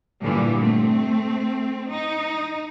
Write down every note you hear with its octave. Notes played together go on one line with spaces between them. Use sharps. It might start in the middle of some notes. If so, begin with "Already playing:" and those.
G2 A#2 D3 E3 G3
A3 C4
D#4